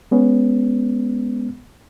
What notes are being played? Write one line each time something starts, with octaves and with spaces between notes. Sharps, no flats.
G#3 B3 C#4